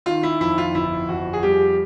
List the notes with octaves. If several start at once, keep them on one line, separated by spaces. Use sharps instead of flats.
D#3 F4
E4
F2 E4
F4
G1 E4
F2 F#4
G#4
G3 G4